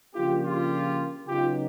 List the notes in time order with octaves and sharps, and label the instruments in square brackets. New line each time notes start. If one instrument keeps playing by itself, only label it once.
[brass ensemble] C#3 F3 A#3 D4 F4 G4
F4 G4
C#3 F#3 B3 D#4 F4 G4